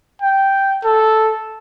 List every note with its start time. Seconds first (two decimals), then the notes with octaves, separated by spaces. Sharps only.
0.22 G5
0.85 A4